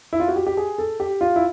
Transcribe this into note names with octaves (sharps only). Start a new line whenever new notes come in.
E4
F4
F#4
G4
G4
G#4
A4
G4
F4
E4